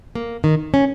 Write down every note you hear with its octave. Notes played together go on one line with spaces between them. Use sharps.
A#3
D#3
C#4